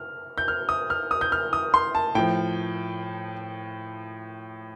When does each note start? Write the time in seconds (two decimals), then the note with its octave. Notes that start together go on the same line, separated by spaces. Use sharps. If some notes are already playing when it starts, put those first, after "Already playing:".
Already playing: F6
0.38 G6
0.48 F6
0.69 D#6
0.90 F6
1.11 D#6
1.21 G6
1.32 F6
1.53 D#6
1.74 C6
1.95 A5
2.15 A2 F3 G5